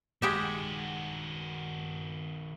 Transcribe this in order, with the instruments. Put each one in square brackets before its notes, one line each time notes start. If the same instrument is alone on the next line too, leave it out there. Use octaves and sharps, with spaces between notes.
[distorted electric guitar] D#3 F#4 [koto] G#3 G4 E5